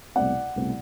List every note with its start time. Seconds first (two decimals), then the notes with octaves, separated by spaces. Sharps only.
0.16 C2 B2 A3 C4 D5 F#5
0.56 C2 B2 A3 C4